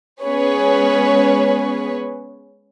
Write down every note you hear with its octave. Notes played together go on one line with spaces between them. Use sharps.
G#3 B3 C#4 G#4 B4 C#5